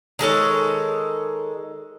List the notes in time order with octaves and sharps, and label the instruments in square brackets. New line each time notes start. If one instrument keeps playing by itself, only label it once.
[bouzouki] D#3 G#3 A4 C#5